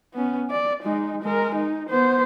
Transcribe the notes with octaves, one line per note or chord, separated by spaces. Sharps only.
B3 C#4
D5
G#3 D#4
G#3 A#4
D#4
B3 C5